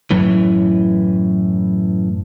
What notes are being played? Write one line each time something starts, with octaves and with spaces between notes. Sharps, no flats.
F#2 A2 E3